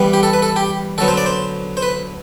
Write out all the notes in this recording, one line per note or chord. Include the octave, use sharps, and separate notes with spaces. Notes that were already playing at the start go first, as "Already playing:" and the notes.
Already playing: E3 G3 B3
G4
A4
B4
A4
G4
D3 F#3 B3 A4
C5
D5
C5
C5
B4